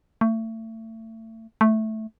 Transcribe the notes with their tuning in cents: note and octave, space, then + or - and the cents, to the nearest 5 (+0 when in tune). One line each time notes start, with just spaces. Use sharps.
A3 +30
A3 -5